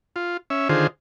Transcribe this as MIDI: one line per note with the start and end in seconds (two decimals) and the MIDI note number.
0.16 0.37 65
0.50 0.68 61
0.50 0.68 76
0.69 0.87 50
0.69 0.87 51
0.69 0.87 65
0.69 0.87 68
0.69 0.87 72